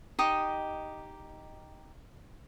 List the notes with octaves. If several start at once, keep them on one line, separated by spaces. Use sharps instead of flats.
D#4 G4 D#5 D6